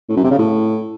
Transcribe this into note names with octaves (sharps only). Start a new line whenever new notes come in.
A2
F#2
C3
C#3
A2